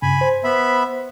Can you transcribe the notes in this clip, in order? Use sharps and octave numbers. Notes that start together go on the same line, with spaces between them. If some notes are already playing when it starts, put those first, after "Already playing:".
G2 C#3 G#5 B5
C5
B3 E5 B5